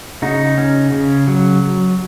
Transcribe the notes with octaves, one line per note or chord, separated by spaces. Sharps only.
C#3 D#4 F#4
C#4
C#3
F#3